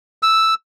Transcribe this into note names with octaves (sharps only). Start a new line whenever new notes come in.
E6